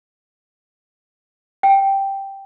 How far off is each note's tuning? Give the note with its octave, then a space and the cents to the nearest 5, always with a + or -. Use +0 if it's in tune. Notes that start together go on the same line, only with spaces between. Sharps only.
G5 +0